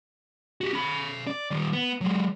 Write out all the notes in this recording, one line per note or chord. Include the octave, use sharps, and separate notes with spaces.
F#4 G4
C#4 B5
D5
D#3 G3
B3
F#3 G#3